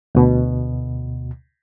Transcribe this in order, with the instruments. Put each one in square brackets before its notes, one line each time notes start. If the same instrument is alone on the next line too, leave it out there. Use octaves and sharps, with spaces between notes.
[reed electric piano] D2 B2